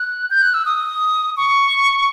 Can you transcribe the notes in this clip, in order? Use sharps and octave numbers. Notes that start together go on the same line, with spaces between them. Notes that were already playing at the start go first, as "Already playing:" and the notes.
Already playing: F#6
G6
F#6
E6
D#6
C#6